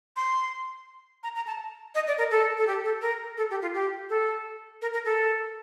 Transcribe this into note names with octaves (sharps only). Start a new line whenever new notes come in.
C6
A#5
A#5
A5
D#5
D5
A#4
A4
A4
G4
A4
A#4
A4
G4
F4
G4
A4
A#4
A#4
A4